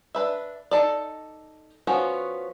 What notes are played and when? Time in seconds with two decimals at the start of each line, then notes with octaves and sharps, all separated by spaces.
0.15 D4 B4 E5
0.71 D#4 A4 D5
1.87 F3 B3 C#4 F#4